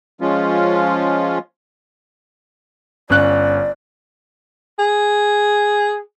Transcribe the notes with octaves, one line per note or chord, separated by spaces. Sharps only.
F3 G#3 C#4 F4
G1 C#4 D5 F#6
G#4